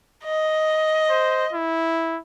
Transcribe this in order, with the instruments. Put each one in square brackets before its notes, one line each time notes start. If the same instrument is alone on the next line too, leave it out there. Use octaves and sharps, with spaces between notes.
[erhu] D#5
[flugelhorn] C5
E4